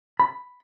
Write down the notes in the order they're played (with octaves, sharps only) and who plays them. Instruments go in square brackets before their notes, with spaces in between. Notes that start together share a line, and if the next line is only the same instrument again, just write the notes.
[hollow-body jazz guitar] B5